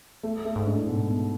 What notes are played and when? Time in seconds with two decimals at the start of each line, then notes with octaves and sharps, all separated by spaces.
0.23 A3
0.45 A3
0.56 G#2
0.67 D4
0.76 A2
0.87 G#2 B2
1.08 B2